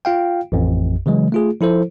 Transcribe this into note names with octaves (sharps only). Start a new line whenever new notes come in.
F4 F5 G5
A1 F2
C#3 E3 F#3 G#3
A3 F4 G#4
F3 E4 A4 C5